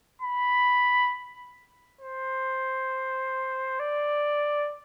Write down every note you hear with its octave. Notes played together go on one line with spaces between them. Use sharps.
B5
C5
D5